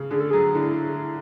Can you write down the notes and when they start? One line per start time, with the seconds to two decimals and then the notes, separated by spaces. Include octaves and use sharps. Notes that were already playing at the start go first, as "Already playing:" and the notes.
Already playing: C#3
0.11 D3 G#4
0.20 A4
0.30 F#3 G#4
0.55 D3 E4